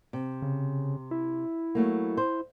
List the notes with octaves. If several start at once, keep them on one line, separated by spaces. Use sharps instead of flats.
C3
C#3
E4
F#3 A3 A#3
C5